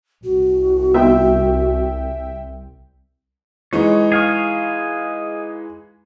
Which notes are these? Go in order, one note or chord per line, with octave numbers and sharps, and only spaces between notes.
C2 F#4
B3 D#4 F4 E5 G5
E3 G#3 D#4 C#5
G#4 F5 C#6